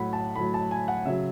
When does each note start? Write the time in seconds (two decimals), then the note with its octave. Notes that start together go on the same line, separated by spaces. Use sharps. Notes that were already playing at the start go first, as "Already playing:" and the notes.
Already playing: A2 F#3 F#5 B5
0.13 A5
0.36 A2 F#3 B5
0.54 A5
0.71 G#5
0.88 F#5
1.05 C#3 F#3 E5